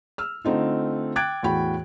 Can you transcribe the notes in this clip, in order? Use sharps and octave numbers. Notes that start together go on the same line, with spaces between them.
E6 F6
D3 A3 C4 D#4 F4
G5 D6 F#6 G#6 A6 D7
E2 A2 F#4 G5 B5